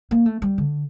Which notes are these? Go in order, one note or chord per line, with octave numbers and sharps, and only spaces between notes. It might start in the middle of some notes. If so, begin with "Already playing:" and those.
A#3
A3
G3
D3